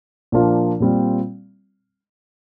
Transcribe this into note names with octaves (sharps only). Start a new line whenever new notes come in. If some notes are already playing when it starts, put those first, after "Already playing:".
A#2 F3 A#3 D4 F4
A#2 G3 C4 F4